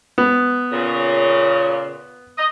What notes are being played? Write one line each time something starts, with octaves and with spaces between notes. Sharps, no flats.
B3
A#2 C#3
D#5